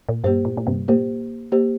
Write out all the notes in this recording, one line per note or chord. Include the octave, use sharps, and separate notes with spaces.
A#2
G2 A#3 G4 C5
A#2
A#2
G2 C3
A#2 A#3 G4 C5
A#3 G4 C5